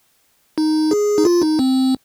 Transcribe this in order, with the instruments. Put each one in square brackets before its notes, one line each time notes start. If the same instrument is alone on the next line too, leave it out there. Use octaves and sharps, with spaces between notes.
[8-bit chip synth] D#4
G#4
D#4
F4
D#4
C4